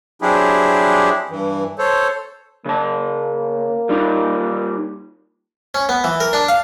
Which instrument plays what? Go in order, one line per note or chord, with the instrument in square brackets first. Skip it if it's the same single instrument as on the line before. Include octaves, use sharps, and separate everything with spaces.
[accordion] F#3 C4 D4 E4 G4 G#4
G2 E3
A4 C5 C#5
[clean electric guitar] C#3 A5 [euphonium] A#3
[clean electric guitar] G3 D#4 F4
[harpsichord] C#4
B3
E3
A#4
D4
F5